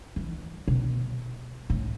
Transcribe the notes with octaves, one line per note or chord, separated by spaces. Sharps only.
E3
B2
A2